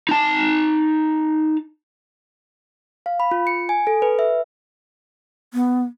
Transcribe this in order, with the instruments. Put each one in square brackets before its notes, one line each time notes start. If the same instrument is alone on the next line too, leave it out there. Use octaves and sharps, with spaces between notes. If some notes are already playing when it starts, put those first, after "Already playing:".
[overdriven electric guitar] D#4 A5
[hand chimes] F5
B5
F4
C#7
G#5
A4
B4
E5
[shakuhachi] B3